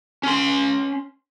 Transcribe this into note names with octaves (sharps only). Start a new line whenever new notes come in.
C#4 C6